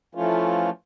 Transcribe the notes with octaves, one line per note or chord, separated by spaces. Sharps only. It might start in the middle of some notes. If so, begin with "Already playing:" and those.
E3 F3 A3 C#4 F4